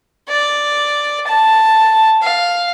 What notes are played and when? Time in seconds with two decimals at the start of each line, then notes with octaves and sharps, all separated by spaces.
0.28 D5
1.27 A5
2.22 F5